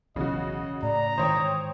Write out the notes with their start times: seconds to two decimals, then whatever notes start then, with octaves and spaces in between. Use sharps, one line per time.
0.16 E1 B1 E2 C#3 F#4 D#5
0.83 A2 D5 A#5
1.18 G#2 D#3 E3 C5 C#5 G5 D#6